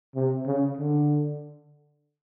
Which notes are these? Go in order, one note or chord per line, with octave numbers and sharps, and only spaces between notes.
C3
C#3
D3